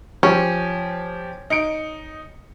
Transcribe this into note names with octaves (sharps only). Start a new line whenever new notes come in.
F3 C#4 G4
D#4 C#7 D7